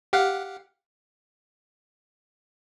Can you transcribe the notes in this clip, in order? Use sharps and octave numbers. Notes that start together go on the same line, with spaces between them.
G4 F5 F#5